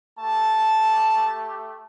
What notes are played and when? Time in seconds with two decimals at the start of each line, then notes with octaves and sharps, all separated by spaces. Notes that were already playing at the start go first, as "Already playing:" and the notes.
0.19 A3 G4 A5